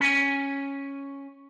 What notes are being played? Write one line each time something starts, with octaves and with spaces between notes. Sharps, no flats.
C#4 G#5